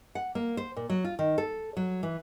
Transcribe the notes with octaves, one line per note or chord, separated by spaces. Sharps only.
F#5
A#3
C5
A#2
F#3
F4
D#3
A4
F#3
E3